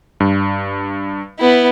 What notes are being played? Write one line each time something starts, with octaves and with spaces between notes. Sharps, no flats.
G2
B3 E4